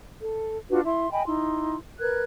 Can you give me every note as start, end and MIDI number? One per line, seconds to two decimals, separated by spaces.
0.21 0.57 69
0.70 0.81 62
0.70 0.81 65
0.70 0.81 66
0.70 0.81 71
0.85 1.10 64
0.85 1.10 76
0.85 1.10 84
1.11 1.23 75
1.11 1.23 79
1.11 1.23 80
1.11 1.23 83
1.27 1.77 63
1.27 1.77 64
1.27 1.77 84
2.00 2.23 70
2.00 2.23 71
2.00 2.23 90
2.00 2.23 92